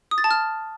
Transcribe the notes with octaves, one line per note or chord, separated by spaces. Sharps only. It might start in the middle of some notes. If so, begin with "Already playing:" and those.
D#6
A6
A5
F6